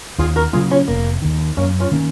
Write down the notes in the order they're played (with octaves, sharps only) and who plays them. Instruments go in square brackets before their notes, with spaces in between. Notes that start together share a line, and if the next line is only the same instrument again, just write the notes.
[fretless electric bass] D#2 [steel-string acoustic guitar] F4 G#4
[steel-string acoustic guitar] F#4 A#4
[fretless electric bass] C#3 F#3 A#3 [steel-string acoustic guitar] F4 G#4
[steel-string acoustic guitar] C#4 F4
[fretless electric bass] F1 [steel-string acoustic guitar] A#3
[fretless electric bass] D#2 D#3
[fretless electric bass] F#2 [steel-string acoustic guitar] A#3 C#4
[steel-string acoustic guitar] C#4 F4
[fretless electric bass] D#3 A#3 C#4